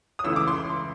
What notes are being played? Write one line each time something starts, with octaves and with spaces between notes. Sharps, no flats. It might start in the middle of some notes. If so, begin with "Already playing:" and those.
D#6
C#2 C#3 E3 A3 E6
D6
C6